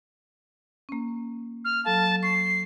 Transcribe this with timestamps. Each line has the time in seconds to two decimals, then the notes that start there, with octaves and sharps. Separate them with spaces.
0.89 A#3 C#4
1.65 F6
1.85 F#3 A4 F5 A5
2.23 C#6 C7